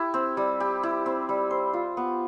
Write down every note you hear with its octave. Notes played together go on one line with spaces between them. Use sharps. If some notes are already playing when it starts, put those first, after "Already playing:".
Already playing: E4 G4
C4
G3
G4
E4
C4
G3
C5
F4
B3